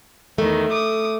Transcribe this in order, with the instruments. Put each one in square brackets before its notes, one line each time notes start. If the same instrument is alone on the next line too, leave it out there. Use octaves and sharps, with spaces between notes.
[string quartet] E2 D#3 [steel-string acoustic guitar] A3
[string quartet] D6 D#6